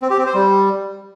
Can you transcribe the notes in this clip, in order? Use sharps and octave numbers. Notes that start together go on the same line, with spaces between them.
C4
G4
C4
C5
G3